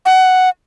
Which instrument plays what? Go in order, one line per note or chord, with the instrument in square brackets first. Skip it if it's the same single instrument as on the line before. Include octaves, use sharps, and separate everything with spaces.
[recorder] F#5